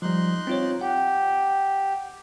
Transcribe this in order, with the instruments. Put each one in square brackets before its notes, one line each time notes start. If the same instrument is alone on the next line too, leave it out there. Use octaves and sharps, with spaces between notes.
[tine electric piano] F3 G3 [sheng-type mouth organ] D#4 C6 F#6
[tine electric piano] C4 F4 C#5
[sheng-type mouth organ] G4 [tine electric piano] F#5